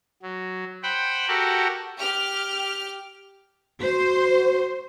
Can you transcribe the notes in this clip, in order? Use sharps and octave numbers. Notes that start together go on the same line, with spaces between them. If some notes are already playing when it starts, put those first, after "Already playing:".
F#3
C5 F#5 G5 B5
F#4 G4 A4 A#4 F#5
G4 F6
F#4 C5